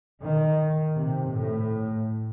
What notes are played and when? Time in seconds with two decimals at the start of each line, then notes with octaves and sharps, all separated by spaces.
0.22 D#3
0.94 C3
1.32 A2